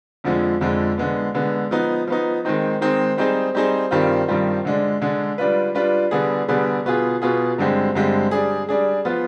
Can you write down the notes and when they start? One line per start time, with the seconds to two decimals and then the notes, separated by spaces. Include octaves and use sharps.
0.24 F2 D3 F3 G#3
0.61 F2 D3 F3 G#3
0.98 D3 G#3 B3
1.35 D3 G#3 B3
1.71 F3 B3 D#4
2.07 F3 B3 D#4
2.45 D#3 G#3 C4 D#4
2.81 D#3 G#3 C4 D#4
3.17 G3 C4 D#4 G#4 C5
3.55 G3 C4 D#4 G#4 C5
3.91 G2 D#3 G3 C4 F4
4.28 G2 D#3 G3 C4 F4
4.65 D3 G#3 D4
5.01 D3 G#3 D4
5.38 G3 D4 F4 B4
5.75 G3 D4 F4 B4
6.11 D3 G3 B3 D4 G#4
6.48 D3 G3 B3 D4 G#4
6.85 B2 B3 F4 G#4
7.22 B2 B3 F4 G#4
7.58 G2 D3 G#3 C4 G4
7.95 G2 D3 G#3 C4 G4
8.31 G3 D4 G#4
8.69 G3 D4 G#4
9.05 F3 B3 F4